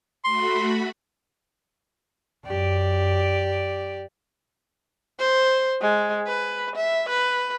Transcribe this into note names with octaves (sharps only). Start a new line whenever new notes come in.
A3 F#4 B5 C6
F#2 G4 D5
C5
G#3
B4
E5
B4